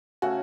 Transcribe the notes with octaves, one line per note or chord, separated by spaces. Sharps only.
C#3 A3 C#4 F#4 A4